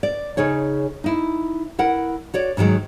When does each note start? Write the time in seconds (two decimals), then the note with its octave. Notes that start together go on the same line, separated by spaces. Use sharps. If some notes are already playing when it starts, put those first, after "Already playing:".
0.03 D5
0.37 C#3 D#4 G#4 C#5
1.04 D#4 E4
1.79 E4 A#4 F#5
2.34 F#4 C#5 D5
2.57 G#2 D3 D#3 F#3 G#3